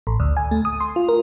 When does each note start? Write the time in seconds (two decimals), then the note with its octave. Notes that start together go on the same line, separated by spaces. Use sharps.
0.07 A1
0.20 D2
0.37 G#5
0.51 A3
0.65 D#6
0.80 C6
0.96 F4
1.09 A#4